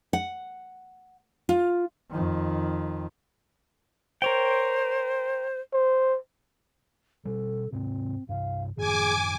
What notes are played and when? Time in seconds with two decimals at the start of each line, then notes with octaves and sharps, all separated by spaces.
0.13 F#5
1.49 F4
2.11 F2 D#3
4.22 A#4 C5 C#5 G5
5.73 C5
7.25 B2 G3 A4
7.72 G#2 C3 C4
8.29 G2 C3 F5
8.77 F#2 A2 D#3 G#4 G#5 D6